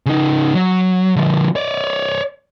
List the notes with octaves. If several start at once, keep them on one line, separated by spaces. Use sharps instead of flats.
C#3 D#4
F#3
D3 F3
C#5 D5